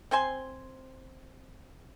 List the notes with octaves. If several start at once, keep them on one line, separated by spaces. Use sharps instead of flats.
C4 C5 G#5 C6